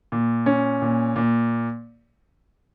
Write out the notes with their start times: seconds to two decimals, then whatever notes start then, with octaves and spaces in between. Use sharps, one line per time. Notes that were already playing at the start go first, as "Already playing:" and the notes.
0.12 A#2
0.46 C#4
0.82 A#2
1.16 A#2